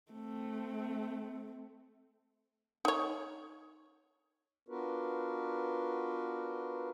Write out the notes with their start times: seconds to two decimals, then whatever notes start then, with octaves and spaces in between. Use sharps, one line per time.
0.12 A3 C4
2.85 D#4 C#5
4.69 B3 D4 F4 F#4 A#4 B4